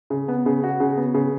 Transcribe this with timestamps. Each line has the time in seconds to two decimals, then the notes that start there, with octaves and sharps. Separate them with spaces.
0.10 C#3
0.28 B3
0.46 C#3
0.63 F#4
0.80 C#3
0.97 B3
1.14 C#3